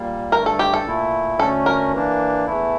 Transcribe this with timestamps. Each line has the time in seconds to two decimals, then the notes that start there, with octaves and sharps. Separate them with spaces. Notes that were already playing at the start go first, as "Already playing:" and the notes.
Already playing: A#2 G3 A#3
0.32 G2 D3 A3 A#4
0.46 A4
0.59 G4
0.74 A4
0.86 A#2 A3 E4
1.39 D2 D3 A3 C#4 A4
1.66 A#4
1.92 E3 A#3 D4
2.47 E2 E3 A3 E4